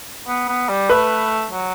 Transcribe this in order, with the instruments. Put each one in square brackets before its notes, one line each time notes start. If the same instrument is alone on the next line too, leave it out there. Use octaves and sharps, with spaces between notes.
[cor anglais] B3
B3
G3
[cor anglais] A3 [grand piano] B4
[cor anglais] F#3